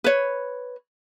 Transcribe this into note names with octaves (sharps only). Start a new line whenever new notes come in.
B4 C#5